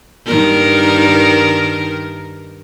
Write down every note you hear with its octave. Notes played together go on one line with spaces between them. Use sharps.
G2 D#3 A#4